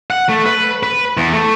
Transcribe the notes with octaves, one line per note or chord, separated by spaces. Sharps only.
F#5
A3
B4
B4
E2
A3